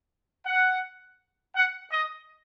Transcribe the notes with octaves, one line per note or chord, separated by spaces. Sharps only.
F#5
F#5
D#5